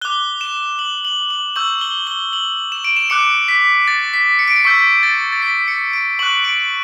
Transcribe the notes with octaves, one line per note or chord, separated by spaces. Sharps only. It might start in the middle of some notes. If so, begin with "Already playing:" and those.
D6 F#6 G7
E7
F#7
F#7
F#7
C#6 E6 G6 F#7
G7
G7
F#7
E7
D7
E7
D6 F#6 C#7
B6
A6
B6
C#7
D7
C#7
C#6 E6 G6 B6
A6
A6
B6
C#7
D7
C#6 F#6 F#7
D7